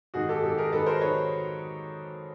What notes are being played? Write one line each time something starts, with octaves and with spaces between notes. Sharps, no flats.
G#2 D#3 F#4 G#4
G4 A4
G#2 D#3 G4 A4
G#4 A#4
G#2 D#3 A4 B4
A#4 C5
D#3 B4 C#5